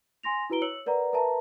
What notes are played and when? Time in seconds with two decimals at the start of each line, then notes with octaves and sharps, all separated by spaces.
0.23 G#5 C6 A#6 F7
0.50 E4 F#4 B4 A#5 D7 G7
0.62 C#5 E6 C#7 F#7
0.86 A#4 B4 D5 F#5 A#5
1.13 A#4 B4 E5 A5 A#5